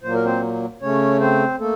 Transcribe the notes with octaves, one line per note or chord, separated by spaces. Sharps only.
A#2 F#3 A#3 C5
A#4
C4 C5
C#3 A3 C#4 C#5
C4 C5
A3 A#3 A4